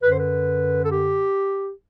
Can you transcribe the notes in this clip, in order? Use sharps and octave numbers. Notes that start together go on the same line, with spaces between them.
F#2 D3 B4
C5
B4
A4
G4